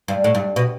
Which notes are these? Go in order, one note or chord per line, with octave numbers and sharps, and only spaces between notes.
G2
A2
G2
B2